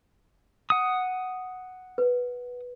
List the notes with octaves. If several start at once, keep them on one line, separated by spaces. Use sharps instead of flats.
F#5 D#6
B4